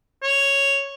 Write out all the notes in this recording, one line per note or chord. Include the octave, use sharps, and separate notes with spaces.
C#5